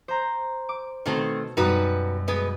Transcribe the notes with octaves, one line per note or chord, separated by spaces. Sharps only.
C5 A#5
D6
B2 D#3 A3 C4 G#6
F#2 B2 G3 D#4 F#4 B4
G#3 B3 B4